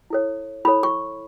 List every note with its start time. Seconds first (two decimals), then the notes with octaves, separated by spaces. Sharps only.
0.10 E4 A4 C#5
0.65 E4 A4 C#5 B5
0.83 C#6